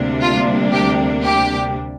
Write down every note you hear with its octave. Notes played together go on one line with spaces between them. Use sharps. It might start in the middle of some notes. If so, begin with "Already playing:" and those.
Already playing: D2 C3 G3 A#3 D4
F4
G4
G4